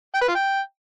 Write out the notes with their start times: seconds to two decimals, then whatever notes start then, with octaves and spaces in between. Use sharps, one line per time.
0.14 G5
0.21 B4
0.28 F4
0.35 G5